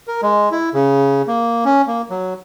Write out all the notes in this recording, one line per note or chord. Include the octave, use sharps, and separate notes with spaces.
A#4
G#3
E4
C#3
A#3
C#4
A#3
F#3